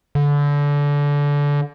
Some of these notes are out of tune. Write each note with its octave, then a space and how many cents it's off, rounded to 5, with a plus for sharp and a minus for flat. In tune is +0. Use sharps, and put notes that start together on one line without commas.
D3 -25